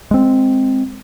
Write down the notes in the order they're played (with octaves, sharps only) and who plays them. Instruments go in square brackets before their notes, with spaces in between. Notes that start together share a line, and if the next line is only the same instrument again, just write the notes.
[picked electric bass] G#3 C4